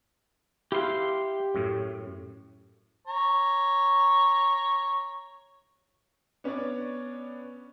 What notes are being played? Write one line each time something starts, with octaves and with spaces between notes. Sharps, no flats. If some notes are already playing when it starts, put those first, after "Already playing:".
E4 G4 B4 F5 C6
F#2 A2
C#5 A#5
B3 C#4 D4 C#5 D5